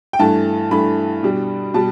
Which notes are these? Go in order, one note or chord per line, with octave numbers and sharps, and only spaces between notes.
G5
G2 E3 A3 A5
G2 E3 A3 B5
B2 G3 D4
B2 G3 A5